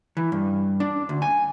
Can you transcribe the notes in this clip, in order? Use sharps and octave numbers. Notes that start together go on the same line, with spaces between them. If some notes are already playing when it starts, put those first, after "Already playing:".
E3
G2
D4
D2
G#5